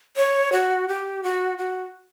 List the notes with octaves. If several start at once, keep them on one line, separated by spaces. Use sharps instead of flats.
C#5
F#4
G4
F#4
F#4